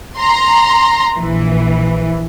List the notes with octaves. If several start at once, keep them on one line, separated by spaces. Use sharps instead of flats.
A#5 C6
A#1 E3